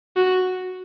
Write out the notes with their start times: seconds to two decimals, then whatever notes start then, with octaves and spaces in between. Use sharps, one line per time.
0.16 F#4